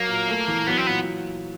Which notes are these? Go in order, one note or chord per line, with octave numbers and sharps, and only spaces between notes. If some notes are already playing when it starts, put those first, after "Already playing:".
Already playing: F#3 A#3
A#2
A3
E3
F#3 B3
C4
A#2 B3